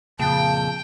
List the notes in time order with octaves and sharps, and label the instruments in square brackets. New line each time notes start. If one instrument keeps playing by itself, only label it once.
[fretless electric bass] F2 A#2 [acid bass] C#3 [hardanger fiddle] G5 [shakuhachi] A5